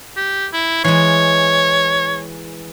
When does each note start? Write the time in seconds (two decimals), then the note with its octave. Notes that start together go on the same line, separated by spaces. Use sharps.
0.16 G4
0.53 E4
0.84 E3 G#3 C#5